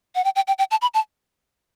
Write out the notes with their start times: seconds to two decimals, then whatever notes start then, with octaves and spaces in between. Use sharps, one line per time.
0.15 F#5
0.24 G5
0.36 G5
0.48 G5
0.58 G5
0.71 A5
0.82 B5
0.94 A5